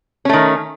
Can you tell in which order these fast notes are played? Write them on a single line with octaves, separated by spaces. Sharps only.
C#4 A3 D#3